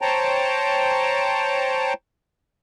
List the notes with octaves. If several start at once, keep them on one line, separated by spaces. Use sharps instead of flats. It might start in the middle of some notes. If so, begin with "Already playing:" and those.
C5 C#5 G5 A5 A#5